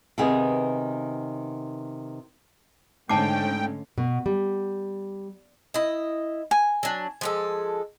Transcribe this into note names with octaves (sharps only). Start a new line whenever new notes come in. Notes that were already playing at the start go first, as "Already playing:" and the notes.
C3 D#3 B3 G#4
G#2 D3 A3 C#4 G5 A5 D6 C7
B2
G3
E4 D#5
G#5
F#3 D4
F3 G#3 A4